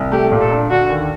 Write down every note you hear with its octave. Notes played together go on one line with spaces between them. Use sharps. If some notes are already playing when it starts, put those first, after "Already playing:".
Already playing: C2
A3 G4
A#2
A4
D4
D3 F#4
D#2